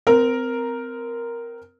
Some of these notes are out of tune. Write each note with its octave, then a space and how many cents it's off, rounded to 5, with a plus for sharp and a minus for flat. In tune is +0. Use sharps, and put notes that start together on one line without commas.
C4 -30 A#4 +0